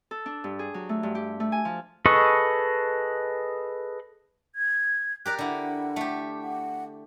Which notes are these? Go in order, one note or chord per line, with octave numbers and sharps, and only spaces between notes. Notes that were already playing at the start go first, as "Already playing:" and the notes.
A4
D4
G2
G#4
F#3
A3
G2
G4
A3
G#5
F3
G#4 A4 B4 D#5 C#6
G#6
G4 A#4 D5 F#6
D3 E4 F#5
A3 G4
F#5